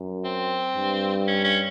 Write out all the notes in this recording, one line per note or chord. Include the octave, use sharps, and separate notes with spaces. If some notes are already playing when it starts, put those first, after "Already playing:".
Already playing: F#2
C4
G2
C#4
C#4